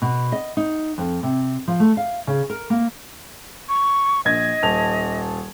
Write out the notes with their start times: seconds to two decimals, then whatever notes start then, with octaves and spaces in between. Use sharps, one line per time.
0.02 B2
0.32 D#5
0.57 D#4
0.98 F2
1.23 C3
1.68 F3
1.80 A3
1.97 F5
2.27 C#3
2.50 A#4
2.70 A#3
3.69 C#6
4.25 A#1 D#5 G#6
4.63 D#1 A5 F7